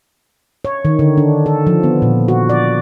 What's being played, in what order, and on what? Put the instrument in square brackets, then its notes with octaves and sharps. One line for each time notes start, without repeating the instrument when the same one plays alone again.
[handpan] C#5
D#3
D3
D4
A4
F3
B3
A#2
F#4
D5